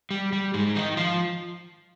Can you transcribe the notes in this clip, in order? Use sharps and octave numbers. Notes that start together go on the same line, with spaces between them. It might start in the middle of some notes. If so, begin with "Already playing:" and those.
G3
G3
G#2 G#3
D#3 D#4
F3 F4